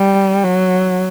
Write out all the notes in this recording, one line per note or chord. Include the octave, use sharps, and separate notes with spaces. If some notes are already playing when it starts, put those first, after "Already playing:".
Already playing: G3
F#3